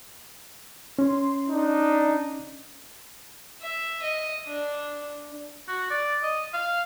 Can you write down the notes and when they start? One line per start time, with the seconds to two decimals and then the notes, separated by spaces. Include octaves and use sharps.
0.99 C#4 C6
1.48 D4 D#4
3.62 E5
4.02 D#5
4.47 D4
5.68 F#4
5.90 D5
6.23 D#5
6.54 F5